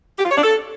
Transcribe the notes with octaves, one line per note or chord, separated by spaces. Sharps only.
G4
F4
C#5
D4
A4